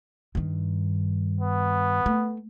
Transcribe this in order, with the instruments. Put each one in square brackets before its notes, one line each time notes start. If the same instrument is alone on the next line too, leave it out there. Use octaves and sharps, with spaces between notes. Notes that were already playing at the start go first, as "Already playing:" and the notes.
[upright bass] G2 D#3
[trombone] B3
[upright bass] A3